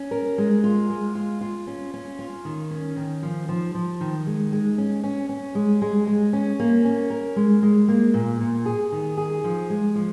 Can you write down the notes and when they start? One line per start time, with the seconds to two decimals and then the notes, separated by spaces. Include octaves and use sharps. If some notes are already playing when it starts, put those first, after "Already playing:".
Already playing: C#4
0.11 A#4
0.38 G#3
0.64 F4
0.90 G#3
1.15 F4
1.41 F4
1.67 C#4
1.94 C#4
2.19 F4
2.45 D#3
2.71 C#4
2.96 D#3
3.23 F3
3.48 F3
3.75 F3
4.01 D#3
4.26 G#3
4.53 G#3
4.78 C#4
5.04 C#4
5.29 C#4
5.55 G#3
5.82 G#3
6.07 G#3
6.33 C#4
6.60 A#3
6.85 C#4
7.10 A#4
7.36 G#3
7.63 G#3
7.88 A#3
8.14 A#2
8.41 A#2
8.66 G#4
8.92 D#3
9.17 G#4
9.44 F3
9.70 G#3
9.95 F3